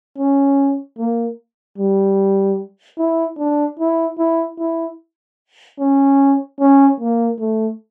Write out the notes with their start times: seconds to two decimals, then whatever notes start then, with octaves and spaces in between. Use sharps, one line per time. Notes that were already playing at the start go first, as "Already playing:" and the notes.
0.18 C#4
0.98 A#3
1.78 G3
2.98 E4
3.38 D4
3.79 E4
4.19 E4
4.59 E4
5.79 C#4
6.60 C#4
7.00 A#3
7.39 A3